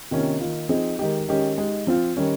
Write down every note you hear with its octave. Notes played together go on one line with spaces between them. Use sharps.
C3 D#3 A#3 C#4 F4
D#3 A#3 F4
F3 C4 D#4 G#4
D#3 G#3 D#4 G4
D#3 G#3 C#4 G4
G#3 D#4 G4
F3 C4 F4
D#3 G3 C#4